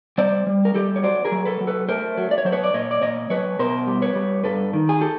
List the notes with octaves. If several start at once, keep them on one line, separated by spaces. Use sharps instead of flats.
G3 C5 D5
G3
A#4
G3 G4 A4
C#5
F#3 C5 D5
G#4 A#4
F#3
A4 B4
F#3
A4 B4
A3 A#4 C5
F#3
D5
C#5
F#3 C5
B4 C#5
D5
A#2 C#5 D#5
D5
A#2 C#5 D#5
F#3 B4 C#5
B2 A#4 C5
G3
B4 C#5
G3
G2 A4 B4
D#3
G#4
G4 A4